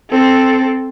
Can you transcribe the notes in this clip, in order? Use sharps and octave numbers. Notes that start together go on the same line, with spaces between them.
C4 A4